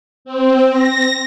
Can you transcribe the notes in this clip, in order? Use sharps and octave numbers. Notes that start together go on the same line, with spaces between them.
C4
A#6